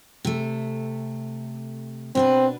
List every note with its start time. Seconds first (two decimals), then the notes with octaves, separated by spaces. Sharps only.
0.25 C3 A3
2.15 B2 C4 D4 B4